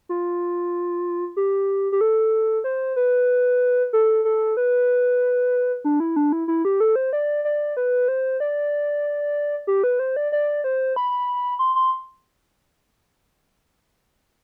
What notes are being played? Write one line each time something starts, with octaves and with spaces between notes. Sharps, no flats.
F4
G4
G4
A4
C5
B4
A4
A4
B4
D4
E4
D4
E4
E4
G4
A4
C5
D5
D5
B4
C5
D5
G4
B4
C5
D5
D5
C5
B5
C6
C6